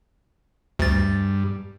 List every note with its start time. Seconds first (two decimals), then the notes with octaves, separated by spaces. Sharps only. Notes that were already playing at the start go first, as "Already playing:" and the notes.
0.79 D2 G2 A6